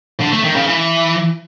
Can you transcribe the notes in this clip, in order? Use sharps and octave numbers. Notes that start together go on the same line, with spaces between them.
D3
A3
D#3
C#3
E3